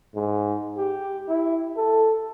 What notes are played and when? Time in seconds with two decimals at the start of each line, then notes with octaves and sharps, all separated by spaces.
0.15 G#2
0.77 G4
1.28 E4
1.77 A4